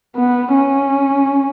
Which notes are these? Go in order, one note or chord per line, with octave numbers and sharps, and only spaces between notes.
B3
C#4